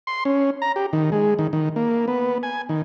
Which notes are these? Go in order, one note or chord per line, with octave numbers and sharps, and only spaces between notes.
C6
C#4
A#5
G4
D#3
G#3
D#3
D#3
A#3
B3
G#5
D#3